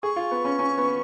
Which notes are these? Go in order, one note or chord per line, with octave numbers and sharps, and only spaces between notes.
G#4 C#6
F4
B3
C#4
C#4
B3